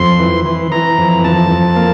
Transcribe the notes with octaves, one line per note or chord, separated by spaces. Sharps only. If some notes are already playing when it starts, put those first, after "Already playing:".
Already playing: F2 C6
E3
E3
E3 A#5
F2
F2 A5
F2
A#3